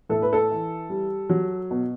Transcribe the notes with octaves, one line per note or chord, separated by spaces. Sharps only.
A2 A4
B4
A4
E3
G3
F#3
B2